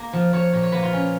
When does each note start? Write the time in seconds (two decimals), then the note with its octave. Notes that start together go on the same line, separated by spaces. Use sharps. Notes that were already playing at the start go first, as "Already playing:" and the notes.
Already playing: A#3
0.13 F3
0.33 F3 C#5
0.53 A#2 C#5
0.63 C#5
0.72 A#3 B4
0.82 F4
0.93 C#4